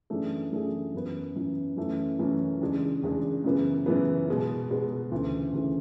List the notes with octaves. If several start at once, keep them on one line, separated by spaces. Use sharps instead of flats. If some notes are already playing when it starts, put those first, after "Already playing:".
F#2 E3 A3 D4 G#4
F#2 E3 A3 D4 G#4
F#2 E3 B3
F#2 E3 B3
F#2 E3 A3 C#4
F#2 E3 A3 C#4
E2 C#3 G#3 D4
E2 C#3 G#3 D4
F#2 C#3 E3 B3
F#2 C#3 E3 B3
B2 G#3 B3
B2 G#3 B3
D2 C#3 E3
D2 C#3 E3